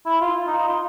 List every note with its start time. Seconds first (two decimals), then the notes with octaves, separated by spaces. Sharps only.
0.06 E4
0.21 F4
0.47 D#4
0.58 D#4
0.68 F4